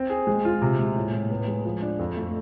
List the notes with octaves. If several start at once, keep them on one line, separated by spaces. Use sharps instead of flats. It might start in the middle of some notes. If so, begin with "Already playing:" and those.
Already playing: C4
G#4
G#3
F4
C3
G#3
A2
A2
B3
G#3
F3
D4
F2
A3